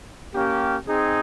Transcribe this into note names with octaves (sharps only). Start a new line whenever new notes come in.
A#3 C#4 G4
C4 D#4 G#4